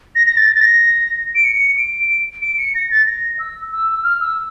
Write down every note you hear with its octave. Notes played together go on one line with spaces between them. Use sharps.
A#6
A#6
A6
A#6
A6
A#6
D7
C#7
D7
D7
C#7
A#6
A6
A#6
E6
E6
F6
E6